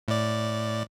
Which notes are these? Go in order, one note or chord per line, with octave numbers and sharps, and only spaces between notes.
A2 D5